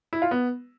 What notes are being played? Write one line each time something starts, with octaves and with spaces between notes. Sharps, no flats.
E4
F4
B3